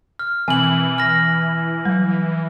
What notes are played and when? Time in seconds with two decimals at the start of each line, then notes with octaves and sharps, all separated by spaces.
0.19 F6
0.48 B2 E3 C4 G#5 F#7
0.98 F6 A#6
1.85 F#3 G3